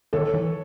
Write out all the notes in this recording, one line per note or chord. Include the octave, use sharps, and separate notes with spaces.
D#3 A4 C#5
E3